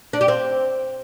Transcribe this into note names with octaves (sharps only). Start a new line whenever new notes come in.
D4
G4
C4